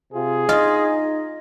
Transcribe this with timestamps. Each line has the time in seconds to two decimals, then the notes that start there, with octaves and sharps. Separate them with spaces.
0.13 C3 F4 G#4
0.49 D#4 F4 D#5